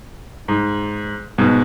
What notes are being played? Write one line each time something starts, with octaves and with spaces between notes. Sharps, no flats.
G#2
G#2 B2